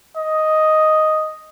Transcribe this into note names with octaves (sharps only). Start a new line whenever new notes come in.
D#5